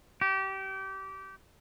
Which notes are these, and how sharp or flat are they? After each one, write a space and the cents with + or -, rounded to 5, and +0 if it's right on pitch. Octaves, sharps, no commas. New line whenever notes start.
G4 -25